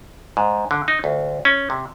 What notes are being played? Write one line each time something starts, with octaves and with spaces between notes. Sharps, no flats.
G#2
D3
D#4
D2
C#4
C3